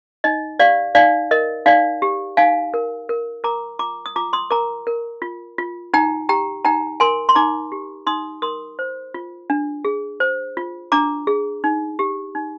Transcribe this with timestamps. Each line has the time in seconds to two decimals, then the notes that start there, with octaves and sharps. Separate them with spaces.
0.24 D#4 D#5
0.59 G4 D5 F5
0.95 D#4 D5 F5
1.31 A#4 D#5
1.66 D#4 D5 F5
2.02 G4
2.37 D#4 F5 G#5
2.74 A#4
3.09 A#4
3.44 A#4 A#5 D6
3.79 F4 A#5 D6
4.06 D#6
4.16 F4 A#5 D6
4.33 C6 D#6
4.51 A#4 A#5 D6
4.87 A#4
5.22 F4
5.58 F4
5.94 D#4 G5 A#5
6.29 G4 G5 A#5
6.65 D#4 G5 A#5
7.00 A#4 G#5 C6
7.29 C6
7.35 D#4 A#5 D6
7.72 G4
8.07 D#4 C6 D#6
8.42 A#4 C6 D#6
8.79 C5
9.14 F4
9.50 D4
9.85 G#4
10.20 C5
10.57 F4
10.92 D4 A#5 D6
11.27 G#4
11.64 D#4
11.99 G4
12.35 D#4